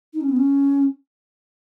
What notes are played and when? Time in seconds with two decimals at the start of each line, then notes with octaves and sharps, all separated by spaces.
0.13 D#4
0.21 C#4
0.29 B3
0.37 C#4